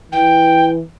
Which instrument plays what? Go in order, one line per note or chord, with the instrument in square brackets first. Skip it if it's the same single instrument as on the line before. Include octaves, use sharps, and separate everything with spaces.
[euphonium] E3 [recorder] G5